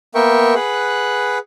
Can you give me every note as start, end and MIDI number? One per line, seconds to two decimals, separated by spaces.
0.15 0.54 58
0.15 0.54 59
0.15 0.54 70
0.15 0.54 76
0.15 0.54 79
0.15 0.54 85
0.55 1.38 68
0.55 1.38 71
0.55 1.38 78